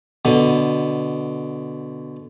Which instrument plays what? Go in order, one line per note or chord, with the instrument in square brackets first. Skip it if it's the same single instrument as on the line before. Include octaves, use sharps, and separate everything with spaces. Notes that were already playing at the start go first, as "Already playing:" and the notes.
[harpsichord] B2 D3